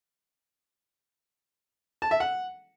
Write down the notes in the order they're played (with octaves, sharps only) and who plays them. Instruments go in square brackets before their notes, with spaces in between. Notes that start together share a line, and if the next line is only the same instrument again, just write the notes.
[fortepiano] A5
E5
F#5